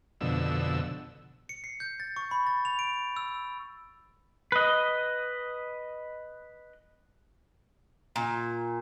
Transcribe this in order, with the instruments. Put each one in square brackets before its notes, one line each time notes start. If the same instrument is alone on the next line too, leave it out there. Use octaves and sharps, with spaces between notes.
[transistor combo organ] F2 B2 D3 E6
[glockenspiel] C#7
C7
G6
A6
C#6
B5
A6
F7
D7
E6
[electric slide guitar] B4 D#5
[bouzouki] A#2